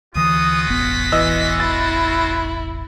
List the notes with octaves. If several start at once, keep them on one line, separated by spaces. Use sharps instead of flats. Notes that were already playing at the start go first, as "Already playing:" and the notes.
D2 E3 C#4 F4 F#4 D#6
E1 A1 B3 B6
E3 D#5 E6
E4 A6